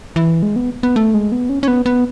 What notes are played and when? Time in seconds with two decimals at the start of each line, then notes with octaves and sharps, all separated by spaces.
0.16 E3
0.43 G#3
0.56 B3
0.83 B3
0.96 A3
1.14 G#3
1.32 B3
1.49 C#4
1.63 C#4
1.68 B3
1.86 B3